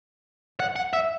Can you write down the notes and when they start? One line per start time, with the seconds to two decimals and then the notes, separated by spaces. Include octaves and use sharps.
0.60 F#5
0.76 F#5
0.93 E5